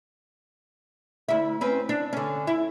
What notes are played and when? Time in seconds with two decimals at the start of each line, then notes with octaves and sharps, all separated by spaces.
1.29 D2 E4
1.61 C4 C#4 B4
1.89 D4
2.13 D3 C#4
2.47 E4